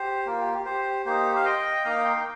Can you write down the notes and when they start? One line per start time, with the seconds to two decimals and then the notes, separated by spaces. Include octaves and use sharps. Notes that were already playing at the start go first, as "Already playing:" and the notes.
Already playing: G4 C5
0.26 A#3 F4 A#4
0.40 G4
0.53 G4
0.66 G4 C5
1.06 A#3 D#4 G4 C5
1.35 F5
1.45 D#5 G5
1.84 A#3 D#4 F5 A#5
2.00 A#5
2.04 G5 C6